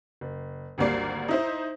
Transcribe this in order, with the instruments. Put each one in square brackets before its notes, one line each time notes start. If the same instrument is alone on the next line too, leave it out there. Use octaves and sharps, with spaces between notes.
[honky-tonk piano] F#1
G#1 D2 G3 A#3 D5 C7
D#4 E4 C5